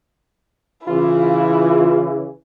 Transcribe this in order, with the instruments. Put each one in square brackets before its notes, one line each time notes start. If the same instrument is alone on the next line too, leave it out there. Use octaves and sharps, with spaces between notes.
[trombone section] C#3 E3 [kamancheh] E4 [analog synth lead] F4